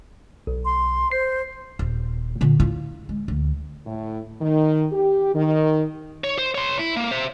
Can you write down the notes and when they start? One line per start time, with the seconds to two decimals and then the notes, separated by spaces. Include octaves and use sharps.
0.47 B1
0.65 C6
1.12 C5 C7
1.79 D#1
2.41 A#2 D3
2.60 A2 F4
3.09 G#3
3.28 D2
3.86 A2
4.42 D#3
4.92 G4
5.35 D#3
6.24 C#5
6.38 C5
6.55 C#5 C6
6.79 E4
6.97 A#3
7.11 C5 E5